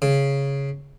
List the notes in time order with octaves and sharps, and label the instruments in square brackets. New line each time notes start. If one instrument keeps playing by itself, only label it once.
[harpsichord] C#3